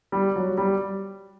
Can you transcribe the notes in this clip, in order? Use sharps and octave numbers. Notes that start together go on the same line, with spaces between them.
G3
F#3
G3